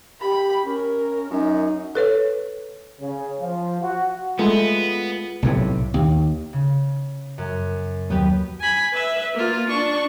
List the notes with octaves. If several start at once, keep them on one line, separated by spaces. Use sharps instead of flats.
G4 B5
C#4 A#4
F#2 D#4
A4 B4 C#5
C#3
F3
F#4
G#3 A3 B3 F4
B1 A2 C3
D#2
C#3
F#2
D#2 F#3 B3 G4 B4
G#5 B5
B4 E5
A#3 F4
D4 C#6